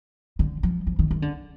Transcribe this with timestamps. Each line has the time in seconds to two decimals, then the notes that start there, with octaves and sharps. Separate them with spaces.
0.39 D3
0.63 F3
0.87 F3
0.99 D#3
1.11 D#3
1.22 D3